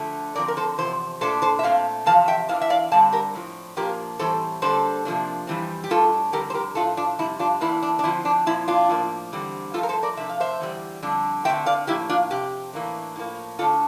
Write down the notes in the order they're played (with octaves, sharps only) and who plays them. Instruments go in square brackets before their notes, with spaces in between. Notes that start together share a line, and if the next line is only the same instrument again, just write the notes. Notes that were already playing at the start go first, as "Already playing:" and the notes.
Already playing: [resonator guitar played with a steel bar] D3 F3 A3 D4
D3 F3 C4 A#4 D5
A#4
A4 C5
E2 C3 F3 C5
A#2 A3 D4 A4 C5
A4 C5
E5
A#2 A3 C4 F5
E2 C3 F3 F5 A5
E5 G5
E2 E3 A3 D4 F5 A5
E5
D5 F5
D3 G3 C4 F5 A5
G4 A#4
A2 F3 C4
A#2 F3 A#3 D4 G4 A#4
A2 E3 G3 C4 A4 C5
D3 G3 A#3 D4 A4 C5
C3 F3 A#3 D4
F2 E3 G3 C4
G4
A2 G3 D4 F4 A4
F2 D3 G3 G4 A#4
C5
G4 A#4
A2 F3 A3 D4 F4 A4
D4 F4
F2 C3 G3 E4
D4 F4
E2 E3 A#3 D4 E4
D4
D4
D3 F3 C4 E4
D4
A#2 F3 C4 E4
D4 F4
A2 F3 A#3
E2 D3 G3 C4
G2 F3 A3 F4 A4
A#4
A4 C5
A#4 D5
C3 F3 A3 D4 E5
F5
C5 E5
E2 D3 G3
F2 D3 G3 D4
D3 A3 C4 E5 G5
D5 F5
A2 F3 A#3 D4 E4 G4
D4 F4
F2 C3 G4
A2 E3 A#3 D4
A2 F3 A#3
D3 A3 D4 F4 A4